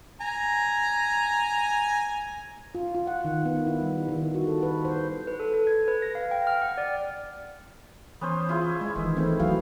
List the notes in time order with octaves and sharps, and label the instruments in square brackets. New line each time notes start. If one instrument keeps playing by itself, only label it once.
[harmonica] G#5 A#5
[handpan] F4
F4
F#5
D#3
B3
E4
G3
D#3
F#4
A4
B4
C5
[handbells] B4
A4
A4
G#6
B4
A#6
F5
G5
F6
F#5
D5
[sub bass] E3 [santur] B3 C#4 C5
[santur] E4 F4 G#4
[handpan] G#3
[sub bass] E1 [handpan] D#3 E3
[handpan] E3 A3 C4
[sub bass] C2 [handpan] F#3 E4 F5